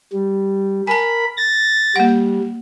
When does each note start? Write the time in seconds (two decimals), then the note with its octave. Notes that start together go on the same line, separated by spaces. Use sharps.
0.13 G3
0.87 A#4 G#5 A5 B5
1.37 A6 A#6
1.96 G3 A#3 F#5